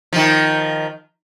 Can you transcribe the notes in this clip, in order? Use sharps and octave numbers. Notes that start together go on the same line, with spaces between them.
D#3 F3